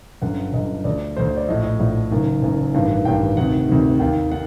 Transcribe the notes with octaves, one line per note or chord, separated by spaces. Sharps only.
G1 F#2 D3 F#5
G1 F#2 D3 D#5
D2 D3 D5
D2 D3 C5
C5
D5
A#1 A2 D#5
D#5
A#1 A2
F#1 F#2 D#3
F#1 F#2 D#3
A1 G2 D#3
A1 G2 D#3 G5
D2 C3 D#3 F#5
D2 C3 D#3
D#2 D#3 G5
D#3 F#5